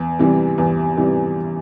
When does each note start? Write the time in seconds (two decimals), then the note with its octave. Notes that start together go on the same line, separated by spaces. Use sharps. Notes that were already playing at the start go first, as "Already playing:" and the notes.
Already playing: E2
0.19 C3 E3 G3
0.58 E2
0.97 C3 E3 G3